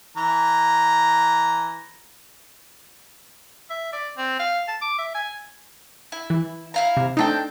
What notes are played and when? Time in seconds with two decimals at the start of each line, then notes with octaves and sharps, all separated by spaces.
0.17 E3 A#5
3.70 E5
3.93 D5
4.18 C4
4.39 F5
4.68 A5
4.82 D6
4.98 E5
5.15 G#5
6.12 E4
6.30 E3
6.74 E4 F5 A#5
6.97 C3
7.17 A3 C4 D4 D#4 G5